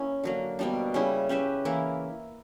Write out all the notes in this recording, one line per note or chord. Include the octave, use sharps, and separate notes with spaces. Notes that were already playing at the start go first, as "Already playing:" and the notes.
Already playing: A#3 C#4 E4
D3 F#3 A#3
B2 G3 A#3 D4
C#3 G3 C#4 E4
C#4 G4 B4 E5
E3 A#3 E4